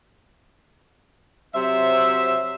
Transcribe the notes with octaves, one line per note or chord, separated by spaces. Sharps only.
C3 F#3 C5 E5